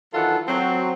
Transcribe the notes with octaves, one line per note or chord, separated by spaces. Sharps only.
D#3 E3 F#3 F4 A4 F#5
F#3 C4